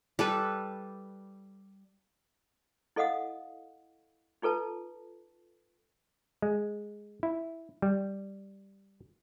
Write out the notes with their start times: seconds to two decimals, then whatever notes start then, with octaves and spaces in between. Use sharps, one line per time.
0.19 G3 A4 B4
2.96 E4 A4 D#5 F5 F#5 D#6
4.42 D#4 F4 A4 B4 A5
6.42 G#3
7.23 E4
7.82 G3